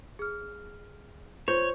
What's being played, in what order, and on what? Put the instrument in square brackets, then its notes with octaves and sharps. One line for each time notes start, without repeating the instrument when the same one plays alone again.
[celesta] G#4 F6
[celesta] F4 G6 [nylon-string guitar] C5 [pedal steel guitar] C#5